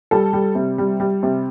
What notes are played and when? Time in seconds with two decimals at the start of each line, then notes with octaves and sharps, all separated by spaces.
0.11 G3 A4
0.33 G3
0.55 C3
0.78 G3
1.00 G3
1.23 C3